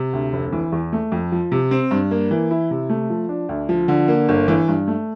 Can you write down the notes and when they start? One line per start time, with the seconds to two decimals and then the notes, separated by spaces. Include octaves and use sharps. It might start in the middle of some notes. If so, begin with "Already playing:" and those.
Already playing: C3
0.13 D2
0.33 F1
0.52 E3
0.72 E2
0.93 A3
1.12 F2
1.32 F3
1.52 C3
1.71 C4
1.91 G2
2.11 A#3
2.31 E3
2.51 E4
2.71 C3
2.89 A3
3.10 F3
3.29 D4
3.49 D2
3.69 F3
3.88 D3
4.08 A#3
4.29 G1
4.48 E3
4.68 G2
4.88 A3